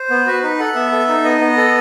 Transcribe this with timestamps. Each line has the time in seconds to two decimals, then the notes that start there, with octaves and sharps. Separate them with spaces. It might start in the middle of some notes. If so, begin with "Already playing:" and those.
Already playing: C5
0.10 B3
0.27 F#4 B4
0.43 D#4 B4
0.59 A4 F#5
0.75 B3 E5
0.92 A4
1.08 D#4
1.24 B3 D#5
1.41 B3
1.57 A4